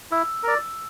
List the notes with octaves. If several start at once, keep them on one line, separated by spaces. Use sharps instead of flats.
E4 E6
A#4 D5